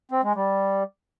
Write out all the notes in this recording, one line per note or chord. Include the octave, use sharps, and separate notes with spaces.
C4
G#3
G3